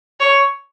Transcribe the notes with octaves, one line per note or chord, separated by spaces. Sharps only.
C#5